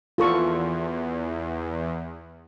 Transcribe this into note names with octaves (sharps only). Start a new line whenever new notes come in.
E2 F4 A4 C#6